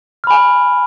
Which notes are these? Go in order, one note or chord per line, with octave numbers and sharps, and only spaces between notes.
G#5 B5 F6